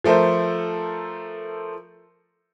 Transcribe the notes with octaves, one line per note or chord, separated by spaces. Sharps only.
F3 A3 A4 A#4 C5